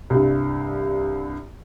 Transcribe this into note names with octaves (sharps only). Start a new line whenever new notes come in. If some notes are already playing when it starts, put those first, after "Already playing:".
C2 G2